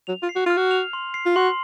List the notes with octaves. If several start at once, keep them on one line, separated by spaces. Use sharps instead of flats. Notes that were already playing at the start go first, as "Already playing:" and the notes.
F#3 F7
F4
C7
F#4
F4 F6
F#4
F7
C6
C7
F4
F#4 C6